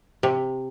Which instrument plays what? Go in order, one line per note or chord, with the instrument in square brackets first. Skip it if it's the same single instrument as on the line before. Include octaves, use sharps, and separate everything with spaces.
[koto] C3